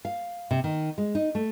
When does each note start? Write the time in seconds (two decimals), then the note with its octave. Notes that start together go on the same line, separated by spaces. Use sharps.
0.05 F5
0.51 C3
0.64 D#3
0.98 G#3
1.15 D#4
1.35 A3